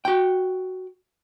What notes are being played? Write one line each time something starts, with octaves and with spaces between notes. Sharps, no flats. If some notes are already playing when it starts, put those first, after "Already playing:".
F#4 G5